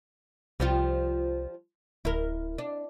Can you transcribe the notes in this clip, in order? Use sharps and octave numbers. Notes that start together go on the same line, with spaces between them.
C2 F3 G3 F4
D1 E4 A#4
D4